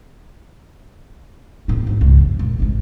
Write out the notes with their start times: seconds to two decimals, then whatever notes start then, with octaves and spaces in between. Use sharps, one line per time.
1.68 G1 A2
1.87 G#1 F2
2.01 C#2
2.17 F2
2.39 A#1
2.60 G#1 G#2